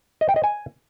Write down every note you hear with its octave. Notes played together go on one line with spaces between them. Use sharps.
D#5
G5
D#5
G#5